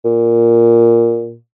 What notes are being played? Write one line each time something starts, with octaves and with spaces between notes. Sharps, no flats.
A#2